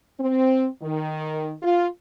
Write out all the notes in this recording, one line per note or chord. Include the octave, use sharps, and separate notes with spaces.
C4
D#3
F4